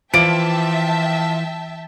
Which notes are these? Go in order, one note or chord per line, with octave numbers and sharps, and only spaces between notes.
E3 F3 F4 E5 G5 A5 D6 D7